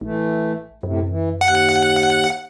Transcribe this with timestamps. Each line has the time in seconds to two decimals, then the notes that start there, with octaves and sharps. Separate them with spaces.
0.01 A1 E3 A3
0.83 F#2 A2 C3
1.09 E3
1.41 D#2 F#5